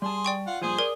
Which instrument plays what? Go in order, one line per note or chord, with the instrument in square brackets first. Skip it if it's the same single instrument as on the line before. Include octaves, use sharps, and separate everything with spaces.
[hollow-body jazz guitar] G3 A5 [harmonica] G#4 C6
[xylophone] D5 G5 C#6
[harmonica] F4 F#5
[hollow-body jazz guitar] G2 A#2 F3 [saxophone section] G#4 [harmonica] C5
[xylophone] A#4 [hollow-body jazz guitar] D5